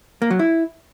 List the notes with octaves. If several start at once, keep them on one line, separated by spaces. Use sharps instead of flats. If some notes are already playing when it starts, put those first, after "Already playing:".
A#3
F#3
E4